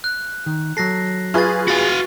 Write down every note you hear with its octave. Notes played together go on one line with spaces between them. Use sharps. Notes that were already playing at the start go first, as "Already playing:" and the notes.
F#6
D#3
F#3 A4 F#6 A#6 C7
F4 G#4 B4 C#6 A6
F#4 F5 A6